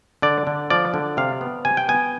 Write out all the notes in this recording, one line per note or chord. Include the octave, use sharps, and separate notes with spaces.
D3 D5
D3
F3 D5
D3
C3 F5
B3
C3 G#5
G5
B3 G#5